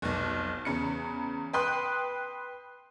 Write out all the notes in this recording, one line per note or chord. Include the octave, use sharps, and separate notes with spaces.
F1 B1
E2 C#3 C#7
B4 G5 C6 D#6 F#6